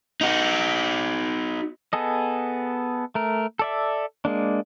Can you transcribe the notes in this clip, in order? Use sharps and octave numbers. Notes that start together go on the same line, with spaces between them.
D#4 F#4
B3 G#4 A4 D#5
A3 A#4
A4 D5 E5
G#3 A#3 D4